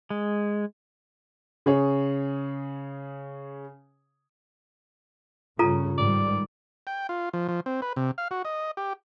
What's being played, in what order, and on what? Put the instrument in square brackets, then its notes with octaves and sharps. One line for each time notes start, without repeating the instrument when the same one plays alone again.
[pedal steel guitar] G#3
[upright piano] C#3 G#4 C#5
[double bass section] G2 C#3 C#4 [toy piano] F4 A4 A#5
[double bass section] G#2 D#3 G3 [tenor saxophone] D5
[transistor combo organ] G5
F4
F3
F3
C4
B4
C3
F5
F#4
D#5
G4